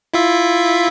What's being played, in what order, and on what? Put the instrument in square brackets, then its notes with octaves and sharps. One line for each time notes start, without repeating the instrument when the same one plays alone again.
[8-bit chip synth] E4 F4 E5